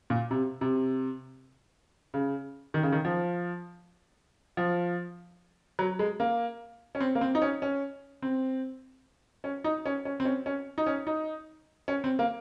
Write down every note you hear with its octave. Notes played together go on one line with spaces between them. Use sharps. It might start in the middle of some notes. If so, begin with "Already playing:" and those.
A#2
C3
C3
C#3
D#3
C#3
D#3
F3
F3
F#3
G#3
A#3
C#4
C4
A#3
C4
D#4
C#4
C#4
C4
C#4
D#4
C#4
C#4
C4
C#4
C#4
D#4
C#4
D#4
C#4
C4
A#3